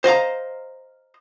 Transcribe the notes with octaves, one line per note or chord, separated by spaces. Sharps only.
C5 D#5 F5 A#5